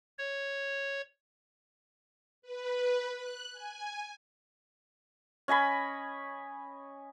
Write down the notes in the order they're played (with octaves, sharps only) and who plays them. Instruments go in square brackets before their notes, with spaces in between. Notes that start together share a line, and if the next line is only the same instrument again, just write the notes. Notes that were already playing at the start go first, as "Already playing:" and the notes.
[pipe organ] C#5
[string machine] B4
F#6
G#5
[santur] C#4 D#5 G#5 B5